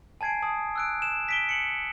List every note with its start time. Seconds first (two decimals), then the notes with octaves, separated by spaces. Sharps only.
0.21 G#5 A5 G#6 C7 D7
0.42 A5 D#6
0.76 E6 F#6 D7
1.02 E7
1.28 B6 D7 G7
1.49 C#7 F#7